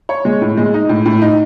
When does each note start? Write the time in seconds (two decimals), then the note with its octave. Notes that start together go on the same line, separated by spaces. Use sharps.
0.09 C#5
0.25 G#3
0.42 A2
0.57 G#3
0.74 D#4
0.89 A2
1.06 A2
1.22 D#4